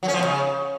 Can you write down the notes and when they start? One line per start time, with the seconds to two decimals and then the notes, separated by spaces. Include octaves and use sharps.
0.03 F#3
0.08 C#4
0.13 F3
0.19 B2
0.24 C#3